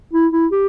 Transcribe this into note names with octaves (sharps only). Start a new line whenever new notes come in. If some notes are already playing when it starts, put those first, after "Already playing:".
E4
E4
G4